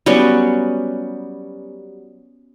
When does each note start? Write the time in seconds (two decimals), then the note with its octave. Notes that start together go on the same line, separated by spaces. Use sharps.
0.06 F#3 G3 B3 C#4